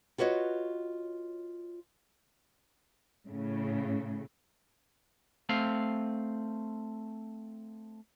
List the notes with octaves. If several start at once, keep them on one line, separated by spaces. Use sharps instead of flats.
F4 F#4 B4 C#5 D#5
A2 C#3
A3 C4 F5